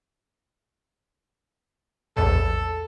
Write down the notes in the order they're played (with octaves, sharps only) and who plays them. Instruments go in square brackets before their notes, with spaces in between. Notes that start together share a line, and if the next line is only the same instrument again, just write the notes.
[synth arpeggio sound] A#1 E2 A2 [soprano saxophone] A4